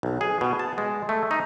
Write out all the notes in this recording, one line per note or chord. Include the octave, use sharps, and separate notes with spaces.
B1
G#4
B2
A5
G#3
A3
D#4